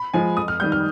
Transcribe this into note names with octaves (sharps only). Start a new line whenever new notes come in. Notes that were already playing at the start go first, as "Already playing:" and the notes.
Already playing: B5
F3 G#3 G#5
F2 D#6
F6
D#3 G3 G6
F6